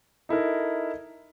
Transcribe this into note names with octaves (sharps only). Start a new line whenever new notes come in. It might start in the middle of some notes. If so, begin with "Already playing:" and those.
D#4 E4 A4 A#4